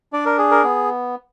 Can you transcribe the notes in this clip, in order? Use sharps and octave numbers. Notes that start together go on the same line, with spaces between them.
D4 D5
A#4
G#4
A#4
B3